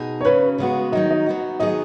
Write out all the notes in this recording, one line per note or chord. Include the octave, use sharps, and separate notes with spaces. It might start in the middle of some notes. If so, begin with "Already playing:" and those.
Already playing: B2 D#4 G#4
C#5
C#3 F#3 C#4 B4
C#3 G#3 B3 F#4
D#3 F#3 D#4 D#5
D#5
F#3 B3 F#4
D#3 F#3 B3 G#4 D#5